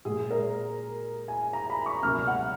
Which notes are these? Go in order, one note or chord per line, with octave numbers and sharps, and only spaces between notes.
A#2 G#3 G#4
A#4
G#5
A#5
B5
C#6
C#2 B2 F#3 A#3 F6
F#5